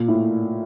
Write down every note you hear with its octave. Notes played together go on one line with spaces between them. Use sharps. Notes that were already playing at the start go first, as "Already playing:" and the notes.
Already playing: A#2
A2